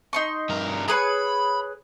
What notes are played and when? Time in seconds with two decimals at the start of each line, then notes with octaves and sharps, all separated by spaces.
0.13 D#4 C6 C#6
0.49 G2 A#4
0.88 G#4 B4 C#5 A#5 B5